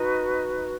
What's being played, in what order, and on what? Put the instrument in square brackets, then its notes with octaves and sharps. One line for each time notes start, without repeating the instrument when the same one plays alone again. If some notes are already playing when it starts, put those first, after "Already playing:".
Already playing: [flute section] D#4 F#4 B4